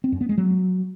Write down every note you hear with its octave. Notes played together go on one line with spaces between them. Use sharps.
C4
F#2
B3
G#3
F#3